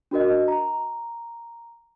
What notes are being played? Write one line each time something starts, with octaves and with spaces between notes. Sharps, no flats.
D4 F#4 A#4 D#5
A#5